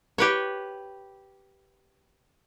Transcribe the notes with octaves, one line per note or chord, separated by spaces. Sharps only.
G4 B4 C#5